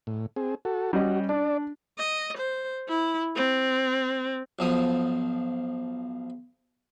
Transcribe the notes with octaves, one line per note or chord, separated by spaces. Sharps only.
A2
C4 G#4
F#4 A4
G3 C#4 F#4 D#5
D4 D5
D#5
C5
E4
C4
B1 F3 D#6